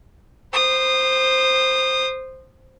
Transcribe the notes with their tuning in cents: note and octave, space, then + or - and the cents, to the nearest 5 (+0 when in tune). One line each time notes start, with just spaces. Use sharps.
C5 +0 D#6 -25